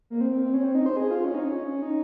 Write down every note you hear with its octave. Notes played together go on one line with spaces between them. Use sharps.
A#3
C4
C4
C4
C#4
C4
D#4
C5
G#4
F4
C#4
D#4
C#4
D#4